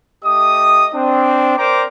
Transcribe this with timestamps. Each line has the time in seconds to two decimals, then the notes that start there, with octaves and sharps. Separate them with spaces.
0.24 A3 G4 D#5 D#6
0.95 C4 D4
1.57 A#4 C5 D5 G5 A#5 D6